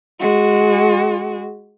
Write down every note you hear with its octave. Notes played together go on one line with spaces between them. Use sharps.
G#3 F#4